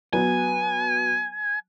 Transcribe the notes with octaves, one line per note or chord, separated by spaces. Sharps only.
F#3 B3 G#5